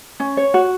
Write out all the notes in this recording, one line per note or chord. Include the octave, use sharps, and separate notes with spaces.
C#4
C#5
F#4